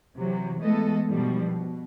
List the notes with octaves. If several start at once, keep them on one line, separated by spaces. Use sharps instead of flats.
C3 E3 F#3
E3 G#3 A3 B3 A4 D#5
G2 B2 D#3 F3 G3
B2